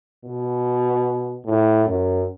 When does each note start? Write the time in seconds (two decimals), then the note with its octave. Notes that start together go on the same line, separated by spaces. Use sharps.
0.24 B2
1.45 A2
1.85 F#2